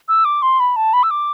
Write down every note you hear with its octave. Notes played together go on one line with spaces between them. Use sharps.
E6
D6
C6
B5
A5
B5
E6
D6